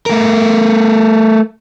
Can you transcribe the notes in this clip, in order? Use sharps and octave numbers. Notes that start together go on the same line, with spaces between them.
A3 A#4